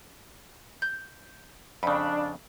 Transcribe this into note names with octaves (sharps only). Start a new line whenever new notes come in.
G6
F2 C#3 D4 B5